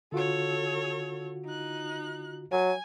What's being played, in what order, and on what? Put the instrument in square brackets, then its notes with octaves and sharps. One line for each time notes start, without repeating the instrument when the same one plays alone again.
[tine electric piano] D3 F4 F#4 [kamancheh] A4 C#5
[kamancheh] D#4 F#6
[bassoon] F#3 [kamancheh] G#5